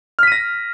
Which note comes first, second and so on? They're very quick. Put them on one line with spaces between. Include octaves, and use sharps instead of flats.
F6 B6 D#7 A#6